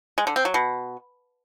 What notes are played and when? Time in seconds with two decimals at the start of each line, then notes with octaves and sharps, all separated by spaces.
0.18 G#3
0.27 D3
0.36 C4
0.45 F#3
0.54 B2